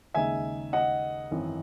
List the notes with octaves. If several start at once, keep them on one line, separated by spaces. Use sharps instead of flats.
D#2 C#3 G#3 D#4 E5 G#5
D#5 F#5
G#1 F#2 E3 C4